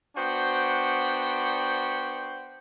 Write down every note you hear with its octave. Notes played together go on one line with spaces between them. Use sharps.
B3 D4 F#4 C5 F#5 G5